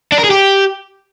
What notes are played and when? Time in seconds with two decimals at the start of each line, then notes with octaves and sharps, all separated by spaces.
0.12 D4
0.18 A#4
0.24 G#4
0.30 G4